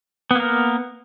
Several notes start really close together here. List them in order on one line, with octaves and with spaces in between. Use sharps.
B3 A#3 A#4